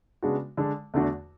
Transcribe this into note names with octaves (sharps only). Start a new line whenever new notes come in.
C#3 G#3 B3 D4 F#4
D3 G#3 D4
E2 D3 A3 D4 F#4